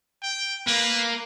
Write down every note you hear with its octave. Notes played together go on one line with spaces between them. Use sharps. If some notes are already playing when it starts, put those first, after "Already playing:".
G5
A#3 B4